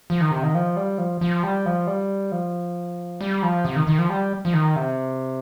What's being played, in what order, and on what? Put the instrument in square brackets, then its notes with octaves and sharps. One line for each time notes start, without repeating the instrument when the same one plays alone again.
[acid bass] F3
D#3
C3
D#3
F3
G3
F3
F3
G3
F3
G3
F3
G3
F3
C3
D#3
D#3
F3
G3
F3
D#3
C3